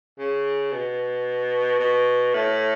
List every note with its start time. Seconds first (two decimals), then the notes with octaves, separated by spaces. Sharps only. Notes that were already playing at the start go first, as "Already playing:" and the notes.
0.18 C#3
0.72 B2
1.79 B2
2.34 A2